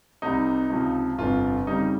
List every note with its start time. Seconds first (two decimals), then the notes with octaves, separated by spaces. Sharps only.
0.22 C2 C3 G3 D#4
0.70 C#2 C3 F3
1.18 G1 F2 C3 F4
1.67 F2 C#3 G3 D#4